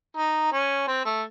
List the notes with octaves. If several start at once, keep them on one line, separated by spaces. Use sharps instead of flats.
D#4
C#4
C4
A3